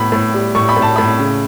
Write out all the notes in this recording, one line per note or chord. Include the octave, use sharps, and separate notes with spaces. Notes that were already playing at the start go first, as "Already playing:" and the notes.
Already playing: A2 B3 B5
A2
G3
A2 C#6
B5
A2
A5
A2 B5
C#3